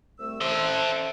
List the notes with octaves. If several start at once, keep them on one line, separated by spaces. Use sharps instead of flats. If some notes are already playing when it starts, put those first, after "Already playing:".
C2 A3 E6
A4 C5 E5 C6